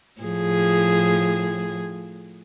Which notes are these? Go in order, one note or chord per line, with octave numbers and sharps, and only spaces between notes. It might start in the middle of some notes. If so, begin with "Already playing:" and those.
A2 F3 G#4